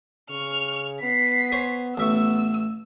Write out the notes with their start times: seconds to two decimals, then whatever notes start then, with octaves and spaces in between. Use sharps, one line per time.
0.30 C#3 C#6 F6
1.02 B3 B6 C7
1.52 C5 C#5 G#5
1.97 A1 B3 E5 C#6 E6